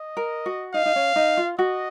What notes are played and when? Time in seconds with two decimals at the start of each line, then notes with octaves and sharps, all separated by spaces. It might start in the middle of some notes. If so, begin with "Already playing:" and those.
Already playing: D#5
0.17 A#4
0.46 F#4
0.74 D#4 F5
0.86 D#4
0.96 C#4
1.16 D#4
1.37 F4
1.59 F#4 D#5